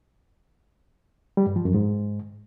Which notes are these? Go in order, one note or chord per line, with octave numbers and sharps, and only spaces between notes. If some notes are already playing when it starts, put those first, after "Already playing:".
G3
G2
F3
F#2
G#2